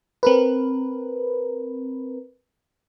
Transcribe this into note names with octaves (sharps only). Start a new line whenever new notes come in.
C4 A#4 B4